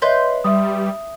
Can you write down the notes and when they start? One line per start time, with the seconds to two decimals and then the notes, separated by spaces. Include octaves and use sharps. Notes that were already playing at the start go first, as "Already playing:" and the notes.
0.02 B4 C#5 D#5 E5 C6 G6
0.44 G3 E5 D#6